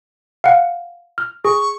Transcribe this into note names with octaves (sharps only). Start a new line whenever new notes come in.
F5 F#5
F6
G#4 C#6